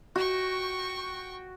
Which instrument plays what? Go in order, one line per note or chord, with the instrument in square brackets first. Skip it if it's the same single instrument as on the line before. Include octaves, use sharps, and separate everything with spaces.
[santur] F#4 [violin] G5 C#6